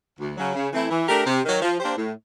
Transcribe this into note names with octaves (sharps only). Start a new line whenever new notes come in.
D2
C#3 F#3
C#3
E3 A3 C4 E4
E3
A3 D4 G4 A#4
C3
D#3 F#3
F3
A#3 D4 G4 C5
A2